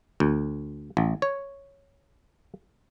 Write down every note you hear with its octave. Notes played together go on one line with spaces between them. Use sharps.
D2
A1
C#5